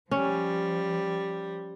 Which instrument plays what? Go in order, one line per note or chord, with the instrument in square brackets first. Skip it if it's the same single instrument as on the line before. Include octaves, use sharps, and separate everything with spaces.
[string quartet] F3 G3 [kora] C#4